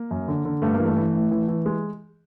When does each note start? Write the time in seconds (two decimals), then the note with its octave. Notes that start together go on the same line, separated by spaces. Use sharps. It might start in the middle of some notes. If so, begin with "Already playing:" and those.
Already playing: A#3
0.11 F#2
0.28 D3
0.45 D3
0.62 G2 A3
0.74 A#3
0.79 E3
0.85 A3
0.97 E3
1.14 A2
1.31 E3
1.48 E3
1.66 G#3